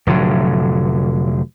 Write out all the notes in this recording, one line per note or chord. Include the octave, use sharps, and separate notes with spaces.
F1 A2 D3 F#3